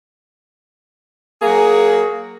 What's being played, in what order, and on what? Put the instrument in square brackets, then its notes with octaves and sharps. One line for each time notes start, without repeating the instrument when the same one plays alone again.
[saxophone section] F#3 A#3 G#4